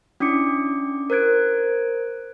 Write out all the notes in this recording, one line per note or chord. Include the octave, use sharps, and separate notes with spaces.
C#4 D4 E4 D6 C#7
A#4 C5 F#6 G#6 D7